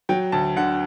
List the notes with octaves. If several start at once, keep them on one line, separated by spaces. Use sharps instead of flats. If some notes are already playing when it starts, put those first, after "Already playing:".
F#3 G5
D2 A5
D3 F#5